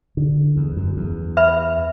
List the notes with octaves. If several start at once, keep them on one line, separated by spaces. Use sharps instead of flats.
D3
E2
F#2
E2
B4 E5 B5